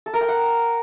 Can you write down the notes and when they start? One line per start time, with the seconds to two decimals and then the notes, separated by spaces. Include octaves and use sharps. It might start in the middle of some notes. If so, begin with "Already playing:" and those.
0.06 A4
0.14 A#4
0.21 G5
0.29 F#5